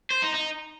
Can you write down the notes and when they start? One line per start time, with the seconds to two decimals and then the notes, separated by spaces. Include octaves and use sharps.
0.10 C5
0.22 D#4
0.34 D#4